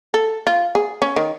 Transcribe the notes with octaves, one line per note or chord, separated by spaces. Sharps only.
A4
F4
G#4
C#4
D#3